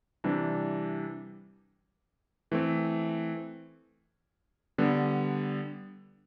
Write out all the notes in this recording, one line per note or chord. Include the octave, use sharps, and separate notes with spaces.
C3 E3 G3 D4
E3 A3 C4
D3 G3 B3